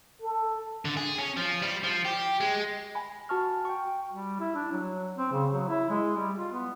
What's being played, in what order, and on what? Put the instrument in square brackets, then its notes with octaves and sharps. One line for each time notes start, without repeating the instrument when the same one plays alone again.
[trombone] A4
[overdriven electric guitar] D3
G#4
C#4
F3
G3
F3
G4
G#3
[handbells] G#5 B5
F#4 A5 C#6 F6
G5 C#6
[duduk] G3
E4
D4
F#3
C4
C#3
F#3
E4
G#3
G3
F4
B3